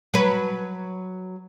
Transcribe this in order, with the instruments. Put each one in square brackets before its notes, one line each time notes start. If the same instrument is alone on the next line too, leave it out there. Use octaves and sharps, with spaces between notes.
[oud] F#3 B4